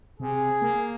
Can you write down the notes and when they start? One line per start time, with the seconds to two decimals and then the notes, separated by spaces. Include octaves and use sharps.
0.20 C3 G#4
0.62 A#3